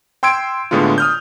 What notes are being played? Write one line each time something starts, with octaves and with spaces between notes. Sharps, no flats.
G5 C6 E6 G#6 D7
A2 D3 G#3 B3 F4
D#6 F6 G6